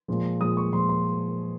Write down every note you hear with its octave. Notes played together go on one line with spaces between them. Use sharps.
A#2 F3 G#3
A#2 F3 G#3 D#6
C#6
A#2 F3 G#3 C6
C6